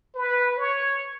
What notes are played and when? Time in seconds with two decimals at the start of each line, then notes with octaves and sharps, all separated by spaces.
0.15 B4
0.57 C#5